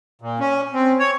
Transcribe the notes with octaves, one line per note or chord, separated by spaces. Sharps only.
A#2
C#4
C4
C#5